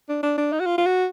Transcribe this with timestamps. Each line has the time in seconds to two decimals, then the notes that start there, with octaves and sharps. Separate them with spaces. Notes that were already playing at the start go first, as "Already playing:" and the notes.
0.09 D4
0.23 D4
0.38 D4
0.52 D#4
0.60 F#4
0.66 F4
0.78 F4
0.86 F#4